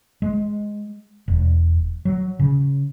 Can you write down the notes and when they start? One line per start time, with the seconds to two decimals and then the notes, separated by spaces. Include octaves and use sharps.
0.22 G#3
1.28 E1
2.05 F#3
2.39 C#3